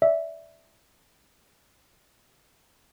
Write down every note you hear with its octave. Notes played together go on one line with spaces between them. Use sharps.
D5 E5